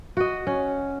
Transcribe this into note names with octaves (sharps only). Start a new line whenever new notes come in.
F#4 D#5
C#4